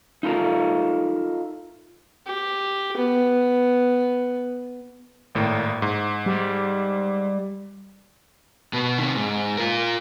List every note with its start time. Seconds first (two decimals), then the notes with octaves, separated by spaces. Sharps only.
0.23 D#4 F4 A4 A#4
2.26 G4
2.97 B3
5.35 G#1 A2 A#3
5.82 G#2
6.26 G3
8.73 B2 B3
8.98 C3 D#3
9.16 G#2
9.57 F4 A#4